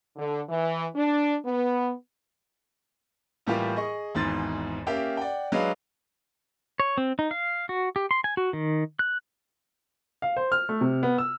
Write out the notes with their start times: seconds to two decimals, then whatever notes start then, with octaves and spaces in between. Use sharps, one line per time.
0.16 D3
0.48 E3
0.95 D4
1.44 B3
3.47 A2 E3 G3 A#3 F4 G4
3.76 G#4 D#5 C#6
4.15 G#1 E2 G#2 C6 A6
4.87 A#3 C#4 G4 E5 F5 G5
5.17 D5 F#5 G5
5.52 F#3 G#3 D4 G#4 B4 F5
6.80 C#5
6.98 C4
7.19 D#4
7.31 F5
7.69 F#4
7.96 G4
8.11 C6
8.24 G#5
8.37 F#4
8.53 D#3
8.99 F#6
10.22 F5
10.36 C5
10.52 F6
10.69 A3
10.81 C3
11.03 B3
11.18 E6